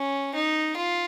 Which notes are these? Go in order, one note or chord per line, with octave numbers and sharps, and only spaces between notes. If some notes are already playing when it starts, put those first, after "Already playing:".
Already playing: C#4
D#4
F4